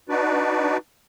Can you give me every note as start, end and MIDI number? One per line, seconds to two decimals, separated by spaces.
0.09 0.77 62
0.09 0.77 63
0.09 0.77 66
0.09 0.77 71
0.09 0.77 74